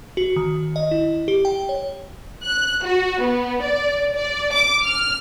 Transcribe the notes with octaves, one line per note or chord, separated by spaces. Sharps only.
F#4
D#3
D#5
E4
G4
G5
C#5
F#6
F#4
B3
D5
D5
D6
F6